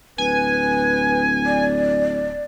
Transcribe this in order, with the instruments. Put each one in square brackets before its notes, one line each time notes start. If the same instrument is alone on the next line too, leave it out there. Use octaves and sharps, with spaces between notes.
[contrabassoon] D1 [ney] B4 [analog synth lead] G#5
[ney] D5